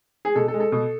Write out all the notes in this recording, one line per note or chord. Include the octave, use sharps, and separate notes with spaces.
G#4
B2 A4
A4
G#3
A4
B2